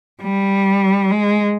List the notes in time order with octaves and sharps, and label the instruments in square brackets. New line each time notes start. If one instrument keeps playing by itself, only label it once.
[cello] G3
G#3